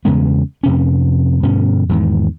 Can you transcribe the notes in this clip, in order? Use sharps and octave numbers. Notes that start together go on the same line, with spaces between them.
E2 C#3 G#3 B3
F2 C3 C#4
G2 B2 D3 C#4
E2 G#2 D#3